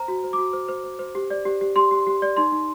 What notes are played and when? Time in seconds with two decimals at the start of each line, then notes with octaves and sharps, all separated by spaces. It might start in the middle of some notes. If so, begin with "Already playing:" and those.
Already playing: C5 A#5
0.08 F#4
0.24 C5
0.33 D6
0.38 F#4
0.53 C5
0.69 C5
0.84 C5
0.99 C5
1.15 G4
1.30 D5
1.45 G4
1.61 G4
1.76 G4 C6
1.91 G4
2.07 G4
2.22 D5
2.37 D#4 C6
2.52 D#4